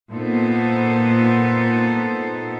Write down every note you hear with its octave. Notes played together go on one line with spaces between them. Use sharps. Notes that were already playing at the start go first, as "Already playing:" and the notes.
A#2 B3 D#4 A4 C5